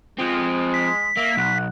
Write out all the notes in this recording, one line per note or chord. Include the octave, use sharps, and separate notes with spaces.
F3 G#3 C4
B6
A#3 E5
B1 F#5